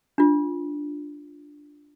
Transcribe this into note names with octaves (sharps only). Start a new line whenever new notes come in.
D4 F4